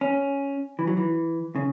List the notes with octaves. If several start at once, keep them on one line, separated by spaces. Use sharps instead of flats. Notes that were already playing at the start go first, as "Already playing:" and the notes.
C#4
E3
F#3
E3
C#3